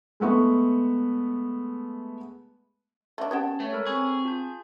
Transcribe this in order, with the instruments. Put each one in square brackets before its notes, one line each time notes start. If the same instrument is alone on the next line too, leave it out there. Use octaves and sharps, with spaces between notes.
[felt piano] G#3 A3 B3 C#6
[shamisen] A3 D4
[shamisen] B3 G4 G5 [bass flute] C#4 [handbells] A5 G#6
[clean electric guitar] A3 [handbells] B4 C#5
[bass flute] G#3 [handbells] A4 A#4 B5
[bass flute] C4 [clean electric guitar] G#4 [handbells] C#6 G#6
[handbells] F4 A5 G6